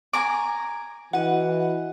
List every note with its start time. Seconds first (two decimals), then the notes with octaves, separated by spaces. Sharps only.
0.13 G#5 A#5 D6
1.13 E3 F#4 D#5 F#5